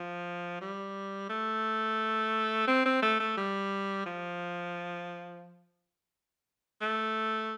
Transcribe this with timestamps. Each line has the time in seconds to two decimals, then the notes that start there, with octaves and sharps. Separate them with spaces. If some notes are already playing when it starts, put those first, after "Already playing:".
Already playing: F3
0.61 G3
1.29 A3
2.67 C4
2.85 C4
3.02 A3
3.20 A3
3.37 G3
4.06 F3
6.81 A3